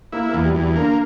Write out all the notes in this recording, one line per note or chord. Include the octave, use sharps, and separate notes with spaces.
A#3 E4
A#3
E2
G3
E2
G3
D3 A#3